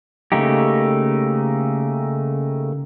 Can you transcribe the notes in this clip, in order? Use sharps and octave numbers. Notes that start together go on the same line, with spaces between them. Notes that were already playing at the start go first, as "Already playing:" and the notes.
C#3 A3 A#3 D#4 G4